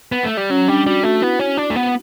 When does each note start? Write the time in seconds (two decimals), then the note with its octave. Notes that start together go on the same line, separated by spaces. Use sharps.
0.12 B3
0.24 A3
0.37 G3
0.50 F#3 C#4
0.68 G3 D4
0.86 G3 F#4
1.03 A3 F#4
1.21 B3 E4
1.39 C#4
1.57 D4
1.70 A3
1.76 B3